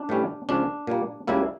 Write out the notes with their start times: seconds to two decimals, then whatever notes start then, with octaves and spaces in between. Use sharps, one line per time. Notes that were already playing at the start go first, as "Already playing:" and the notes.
Already playing: D4
0.09 A2 E3 G3 C#4
0.49 C#2 C#3 F3 C#4 D4
0.87 A#2 G3 A#3
1.27 C#2 C#3 G3 A#3 E4